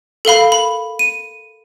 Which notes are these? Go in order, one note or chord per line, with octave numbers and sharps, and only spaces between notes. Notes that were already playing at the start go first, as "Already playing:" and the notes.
A4 A#4 F5 B5
B5
D#7